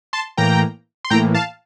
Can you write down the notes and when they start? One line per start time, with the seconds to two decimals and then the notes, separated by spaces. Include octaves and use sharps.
0.13 A5 C6
0.37 A2 E3 A#3 G5 A#5
1.05 C6
1.10 A2 E3 A#3 G5 A#5
1.34 F5 A5